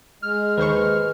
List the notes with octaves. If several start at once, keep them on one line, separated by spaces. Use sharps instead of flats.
G#3 F6
D#2 B4 C5 C#6